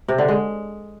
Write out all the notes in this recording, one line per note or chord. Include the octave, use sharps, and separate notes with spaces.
C3
D3
G#3